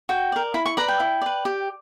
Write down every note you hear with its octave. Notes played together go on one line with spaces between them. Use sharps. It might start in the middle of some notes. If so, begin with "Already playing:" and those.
F#4 G5
A#4 D5
E4 B5
C#6
B4 D5 A#5
G5
E4
B4 D5
G4